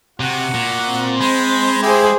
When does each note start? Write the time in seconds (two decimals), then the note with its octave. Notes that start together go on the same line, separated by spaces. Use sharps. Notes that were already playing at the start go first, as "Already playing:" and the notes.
0.20 C3 F#4 F#5
0.54 A#2
0.87 C4
1.20 G#3 C5 B5
1.83 E4 G4 G#4 C5